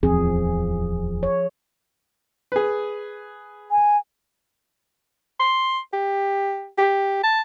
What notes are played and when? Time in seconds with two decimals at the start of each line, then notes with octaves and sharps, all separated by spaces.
0.03 D1 E2 F3 C4 G#4
1.23 C#5
2.52 G#4 B4
3.71 G#5
5.40 C6
5.93 G4
6.78 G4
7.23 A5